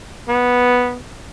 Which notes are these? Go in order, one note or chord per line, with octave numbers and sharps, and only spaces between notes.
B3